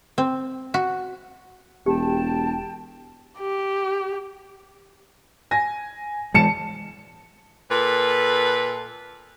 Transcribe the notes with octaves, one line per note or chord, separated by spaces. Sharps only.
C4
F#4
E1 G4 G5 A5
G4
G#5 A#6
E3 F3 G#3 A5 C#7 E7
A#2 A4 B4